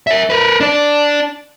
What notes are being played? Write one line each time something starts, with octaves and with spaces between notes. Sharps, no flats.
A#4 E5
A#4 B4
D4 D5